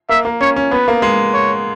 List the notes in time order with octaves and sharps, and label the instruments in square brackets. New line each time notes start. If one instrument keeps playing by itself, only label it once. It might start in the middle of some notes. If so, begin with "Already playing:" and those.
[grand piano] A#3 [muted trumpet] E5
[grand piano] A#3
[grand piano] C#4 [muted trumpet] C#5
[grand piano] C#4
[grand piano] B3 [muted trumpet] B4
[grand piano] A#3
G#3
[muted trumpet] C#5